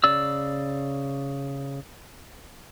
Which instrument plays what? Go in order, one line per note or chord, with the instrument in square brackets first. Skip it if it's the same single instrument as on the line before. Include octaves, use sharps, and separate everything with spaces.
[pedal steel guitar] C#3 D5 E6